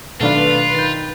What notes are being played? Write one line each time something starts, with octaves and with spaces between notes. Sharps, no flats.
B2 D#3 F#3 A3 D4 F4 B4 F5
D#3 G6 A6